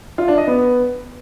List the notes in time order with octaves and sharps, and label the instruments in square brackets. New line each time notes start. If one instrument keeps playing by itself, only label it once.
[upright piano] F4
D4
D#5
B3